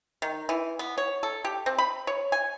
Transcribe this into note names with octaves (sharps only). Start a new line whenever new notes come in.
D#3
E3
B3
C#5
A4
G4
C4
B5
C#5
G#5